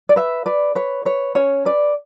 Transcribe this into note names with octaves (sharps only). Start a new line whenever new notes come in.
D5
B4 E5
B4 D5
B4 C#5
B4 C#5
C#4 C#5
B4 D5